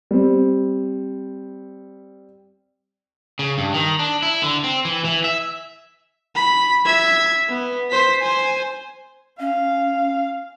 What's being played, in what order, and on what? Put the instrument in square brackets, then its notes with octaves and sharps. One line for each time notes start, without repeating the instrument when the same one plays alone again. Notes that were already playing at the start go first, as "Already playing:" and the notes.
[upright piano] G3 C4
[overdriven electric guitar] C#3
G2
D#3
D4
E4
D3
C4
E3
E3
E5
[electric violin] B5
E5 G#6
B3
C5 B6
C5 G#5
[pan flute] C#4 [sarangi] F5